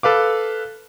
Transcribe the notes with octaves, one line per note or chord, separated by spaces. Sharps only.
A4 B4 F5 D6